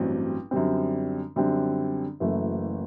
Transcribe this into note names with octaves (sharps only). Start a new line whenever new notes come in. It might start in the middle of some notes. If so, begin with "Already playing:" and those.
Already playing: A1 G2 F#3 C4
F#2 D3 G3 C4
F#2 D3 G3 C4
F#1 F#2 E3 A3